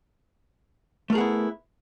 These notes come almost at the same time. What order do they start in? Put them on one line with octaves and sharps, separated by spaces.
A3 A#4 G#4 B3 E4